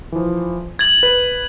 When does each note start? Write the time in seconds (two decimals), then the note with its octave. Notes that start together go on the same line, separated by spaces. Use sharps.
0.12 E3 F3
0.79 G#6 A6 F#7
1.03 B4